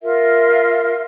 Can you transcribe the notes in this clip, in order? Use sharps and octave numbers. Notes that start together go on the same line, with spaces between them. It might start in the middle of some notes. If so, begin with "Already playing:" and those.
F4 A#4 E5